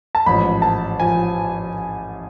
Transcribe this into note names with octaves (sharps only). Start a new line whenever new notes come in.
A5
A1 G#2 F3 B5
A5
F3 G#5